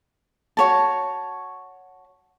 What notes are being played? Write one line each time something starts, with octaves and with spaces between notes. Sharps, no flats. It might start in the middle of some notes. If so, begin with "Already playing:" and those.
F#4 C#5 A5